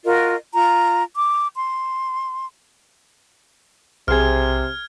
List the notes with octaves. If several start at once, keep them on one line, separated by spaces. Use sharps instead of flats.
F4 F#4 A#4 D#5
F4 A#5
D6
C6
B1 C3 G#4 C5 F6 G#6